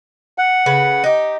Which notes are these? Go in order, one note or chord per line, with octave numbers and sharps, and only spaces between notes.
F#5
C#3 B4
D#4 G4